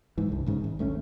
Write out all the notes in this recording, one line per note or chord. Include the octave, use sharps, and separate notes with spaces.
G#2 E3
C2 G2
G#1 G#2 C#3
G#1
D2 A3 B3 C#4